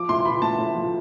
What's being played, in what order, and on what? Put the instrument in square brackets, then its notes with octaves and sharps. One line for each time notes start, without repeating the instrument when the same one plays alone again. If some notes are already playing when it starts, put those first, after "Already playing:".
Already playing: [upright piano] F3 D6
A2 C6
F3 B5
A2 A5
A2
F3